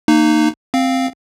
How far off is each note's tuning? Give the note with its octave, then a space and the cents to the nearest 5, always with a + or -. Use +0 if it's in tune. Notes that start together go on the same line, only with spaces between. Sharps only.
A#3 -25 D#4 -20
C4 +0 F5 +0